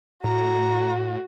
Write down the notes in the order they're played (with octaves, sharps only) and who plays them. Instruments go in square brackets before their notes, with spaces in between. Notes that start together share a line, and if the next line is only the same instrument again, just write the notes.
[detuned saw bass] A2 [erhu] F#4 [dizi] A#5